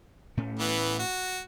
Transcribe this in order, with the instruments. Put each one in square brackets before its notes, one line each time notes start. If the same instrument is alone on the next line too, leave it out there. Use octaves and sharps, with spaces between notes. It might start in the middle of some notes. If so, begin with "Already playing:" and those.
[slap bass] A2 A3 C#4
[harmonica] E3 B3
F#4